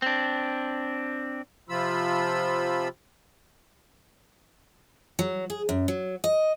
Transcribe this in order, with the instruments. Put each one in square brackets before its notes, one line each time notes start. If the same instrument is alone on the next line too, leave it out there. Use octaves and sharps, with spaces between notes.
[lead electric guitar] C4 D4
[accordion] C3 F3 F4 B5 E6
[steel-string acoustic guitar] F#3
G#4
F#2
F#3
D#5